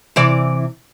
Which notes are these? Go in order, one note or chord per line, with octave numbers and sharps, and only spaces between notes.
C3 E3 D5